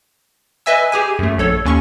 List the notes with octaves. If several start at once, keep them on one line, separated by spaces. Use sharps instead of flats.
B4 D#5 E5 G#5 E6
G4 G#4 G#5
F#2 A3
A#1 A4 C#5
D#2 C#4 C#6